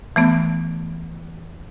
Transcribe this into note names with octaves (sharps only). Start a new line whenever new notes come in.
E3 A3 B3